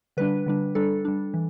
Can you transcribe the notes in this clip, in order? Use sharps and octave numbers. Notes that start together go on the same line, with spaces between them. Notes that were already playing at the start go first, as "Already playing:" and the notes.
D3 G3 D4 B4
D3 G3 D4
G3 D4 A4
G3 D4
E3